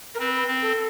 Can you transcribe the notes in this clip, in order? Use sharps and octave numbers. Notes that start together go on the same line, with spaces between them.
A#4
C4 B4
C4
A4